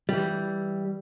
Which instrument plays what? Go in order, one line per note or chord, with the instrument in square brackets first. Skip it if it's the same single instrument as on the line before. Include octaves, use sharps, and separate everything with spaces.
[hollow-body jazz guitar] E3 G3